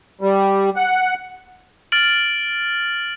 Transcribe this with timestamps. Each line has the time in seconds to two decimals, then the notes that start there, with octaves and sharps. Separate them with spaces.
0.21 G3
0.76 F#5
1.92 F6 A6 D7 F#7